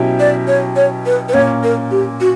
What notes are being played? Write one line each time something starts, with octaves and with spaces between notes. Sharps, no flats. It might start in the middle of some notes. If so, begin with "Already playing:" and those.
Already playing: B2 F#3 C#4 E4 G4
D5
C#5
C#5
B4
B4
A#2 A#3 C#4 C#5
A#4
G4
F#4